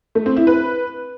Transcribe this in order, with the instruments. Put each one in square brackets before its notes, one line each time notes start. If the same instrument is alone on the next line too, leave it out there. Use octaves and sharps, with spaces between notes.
[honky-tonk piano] A3
C4
E4
B4